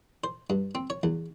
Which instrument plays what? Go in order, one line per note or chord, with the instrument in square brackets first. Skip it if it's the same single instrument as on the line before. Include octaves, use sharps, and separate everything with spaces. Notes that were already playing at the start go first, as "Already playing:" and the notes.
[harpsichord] C5
G2
C4
C#5
E2